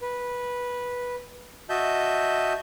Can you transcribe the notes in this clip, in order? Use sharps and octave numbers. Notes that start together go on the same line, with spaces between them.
B4
F#4 D#5 E5 A5 G6